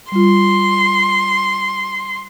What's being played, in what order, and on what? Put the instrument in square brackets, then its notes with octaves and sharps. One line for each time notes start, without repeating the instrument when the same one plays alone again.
[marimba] G3 F4 [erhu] C6